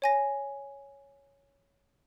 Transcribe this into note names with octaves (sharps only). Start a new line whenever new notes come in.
C#5 G#5 A#6